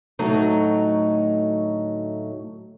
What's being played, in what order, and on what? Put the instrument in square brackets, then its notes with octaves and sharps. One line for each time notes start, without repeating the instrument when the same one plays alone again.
[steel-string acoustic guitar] D2 A2 F#3 A3 D#4 A#5